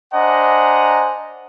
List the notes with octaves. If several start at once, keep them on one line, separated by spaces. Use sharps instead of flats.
D4 C5 D#5 F#5 G#5 A#5